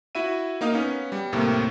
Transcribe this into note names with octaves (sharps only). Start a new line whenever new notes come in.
E4 F#4 E5 D#7
A#3 D#4 F5 D#6
B3 C#4
G3
D#2 A2 C3 A#3